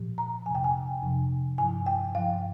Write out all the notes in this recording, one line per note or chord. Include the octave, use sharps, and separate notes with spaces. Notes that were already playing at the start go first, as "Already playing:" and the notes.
Already playing: A#2 F3
A#5
F2 C3 F3 G#5
G5
G#5
F2 C3 F3
G2 F3 G#5
G5
G2 F3 F5